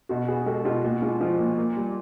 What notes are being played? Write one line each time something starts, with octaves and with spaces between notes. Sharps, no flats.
B2 F#4
B3 F#4 G#4
G#3 G4 A4
B2 F4 G4
A#2 F#4
G#3 F4
F3 F4
A#2
A#3
G3